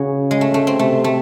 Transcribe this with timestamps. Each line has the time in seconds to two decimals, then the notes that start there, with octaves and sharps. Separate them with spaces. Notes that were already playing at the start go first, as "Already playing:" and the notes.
Already playing: C#3 F#4 G#4
0.31 G#3
0.41 A3
0.54 A3
0.67 C4
0.79 C3 A3
1.04 A3